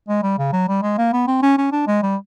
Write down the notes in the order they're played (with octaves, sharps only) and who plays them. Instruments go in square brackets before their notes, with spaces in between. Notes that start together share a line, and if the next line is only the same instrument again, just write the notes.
[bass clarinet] G#3
G3
C#3
F#3
G3
G#3
A#3
B3
C4
C#4
C#4
D4
G#3
G3